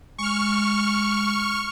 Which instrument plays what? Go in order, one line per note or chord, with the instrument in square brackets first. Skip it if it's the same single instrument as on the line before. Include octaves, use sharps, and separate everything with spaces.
[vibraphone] G#3 [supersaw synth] C#6 F6